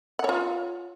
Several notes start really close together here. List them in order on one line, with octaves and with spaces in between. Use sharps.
F#5 C#5 F4